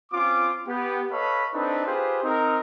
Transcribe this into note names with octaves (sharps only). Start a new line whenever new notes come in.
C4 C#4 F4 D6
B3 G4
A4 B4 C#5 D#5 F5 B5
C4 D4 D#4 A4 B4
F4 G4 G#4 B4 C5
C4 D#4 A#4